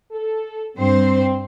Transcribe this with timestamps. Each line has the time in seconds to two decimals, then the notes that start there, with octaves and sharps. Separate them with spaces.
0.12 A4
0.78 G2 C4 C5